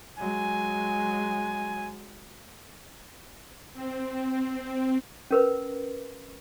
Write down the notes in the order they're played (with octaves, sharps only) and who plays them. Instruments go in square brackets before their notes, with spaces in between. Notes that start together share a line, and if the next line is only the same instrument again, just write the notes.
[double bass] F#3 G#3 [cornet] G#5
[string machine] C4
[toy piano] C#4 A#4 B4